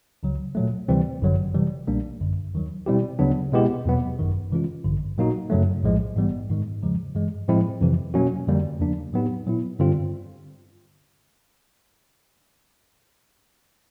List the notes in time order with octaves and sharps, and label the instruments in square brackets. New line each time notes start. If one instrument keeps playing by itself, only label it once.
[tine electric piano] C#2 C#3 F#3
A#2 F#3 A3
D2 C3 E3 G3 C4
G1 F#2 D3 F#3
C3 E3 G3
B1 A#2 G3 A#3 D4
G#1 F#2 D3
D#2 D#3 F#3
B2 G3 C4 E4 G4
D2 C#3 F#3 B3 D4
B2 G#3 B3 E4 G4
E2 B2 F#3 B3
G#1 F#2 D#3
C3 E3 G#3 C#4 F4
A1 G2 D3
A#2 F#3 A#3 D#4 F#4
F#2 C#3 F#3 A3
A#1 A2 F3 G#3
G#2 E3 G3 B3
G#2 D#3 G#3
E2 C#3 F3 G#3
G2 E3 G#3
A2 F3 G#3 C4 E4
F2 C3 E3
B2 F#3 A#3 C#4 F#4
F2 D3 G3 A#3
E2 C#3 F3 A#3 D4
A2 F#3 B3 D#4 G4
A#2 F#3 B3 E4
G2 D3 G3 C4 F4